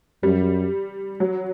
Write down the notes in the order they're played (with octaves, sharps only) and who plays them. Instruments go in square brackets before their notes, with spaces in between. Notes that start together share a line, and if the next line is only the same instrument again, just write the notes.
[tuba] F#2 [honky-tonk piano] G3
[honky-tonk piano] F#3